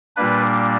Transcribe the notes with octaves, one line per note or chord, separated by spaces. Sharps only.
A#2 G3 A#3 D4 B4